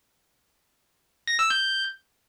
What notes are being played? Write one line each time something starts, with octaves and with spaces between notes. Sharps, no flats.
A#6
E6
G6